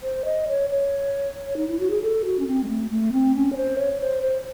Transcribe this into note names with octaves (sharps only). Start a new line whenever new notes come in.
C5
D#5
C#5
C#5
D#4
E4
F#4
G#4
A4
F#4
C#4
C4
G#3
A3
A3
C4
C#4
C#5
C5
C#5
C5
C5